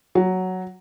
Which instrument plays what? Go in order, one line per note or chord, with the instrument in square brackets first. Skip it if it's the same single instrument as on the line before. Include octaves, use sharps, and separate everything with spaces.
[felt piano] F#3